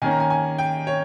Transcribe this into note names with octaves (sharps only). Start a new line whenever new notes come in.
D#3 A#3 C#4 G#5
A#5
G#5
G#5
G5
C#5